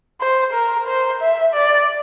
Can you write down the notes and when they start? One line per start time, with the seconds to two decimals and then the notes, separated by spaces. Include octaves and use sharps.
0.21 C5
0.53 A#4
0.87 C5
1.21 E5
1.54 D5